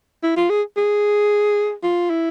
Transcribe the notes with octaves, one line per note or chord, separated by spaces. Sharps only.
E4
F4
G#4
G#4
F4
E4